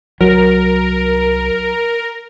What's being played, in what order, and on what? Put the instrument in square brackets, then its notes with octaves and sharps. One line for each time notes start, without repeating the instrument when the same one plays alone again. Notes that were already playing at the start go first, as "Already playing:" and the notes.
[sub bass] C2 [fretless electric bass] F#3 [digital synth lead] A#4